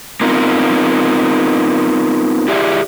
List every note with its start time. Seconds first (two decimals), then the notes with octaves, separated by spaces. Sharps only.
0.21 B3 C4 D#4 F4 A#4
2.48 E4 G4 G#4 D5 E5